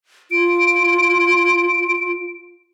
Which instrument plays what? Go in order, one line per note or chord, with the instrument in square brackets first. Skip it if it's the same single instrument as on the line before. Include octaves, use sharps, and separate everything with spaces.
[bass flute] F4 [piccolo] D7